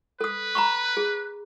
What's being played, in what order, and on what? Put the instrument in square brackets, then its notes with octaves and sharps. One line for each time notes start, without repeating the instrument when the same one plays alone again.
[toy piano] A4 D#6 [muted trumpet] B4
[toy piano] A#5 B5 C#6
G#4